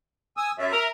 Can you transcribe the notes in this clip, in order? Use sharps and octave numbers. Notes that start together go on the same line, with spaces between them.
G#5 D#6 E6
F#2 E5
A#4